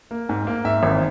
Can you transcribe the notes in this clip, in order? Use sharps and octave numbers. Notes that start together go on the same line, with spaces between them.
A#3
G#2
A#3
G#2 E5
G#1